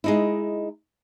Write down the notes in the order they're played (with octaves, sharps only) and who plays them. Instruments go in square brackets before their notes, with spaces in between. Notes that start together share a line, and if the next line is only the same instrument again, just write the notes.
[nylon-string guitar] G#3 D#4 E4